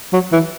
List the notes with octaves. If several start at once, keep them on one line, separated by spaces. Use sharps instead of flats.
F#3
E3